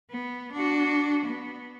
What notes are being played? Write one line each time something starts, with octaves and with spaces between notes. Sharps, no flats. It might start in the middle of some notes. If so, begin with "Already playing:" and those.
B3
D4 F#4
B3